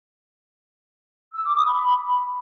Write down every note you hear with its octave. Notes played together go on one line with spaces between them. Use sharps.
E6
D6
D#6
B5